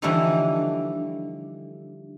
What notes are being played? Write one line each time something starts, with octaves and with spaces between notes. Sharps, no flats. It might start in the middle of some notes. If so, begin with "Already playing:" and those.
D3 E3 F3 G3 A3 D#4